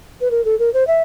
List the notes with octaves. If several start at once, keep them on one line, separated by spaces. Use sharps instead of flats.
B4
A#4
A4
A#4
C5
E5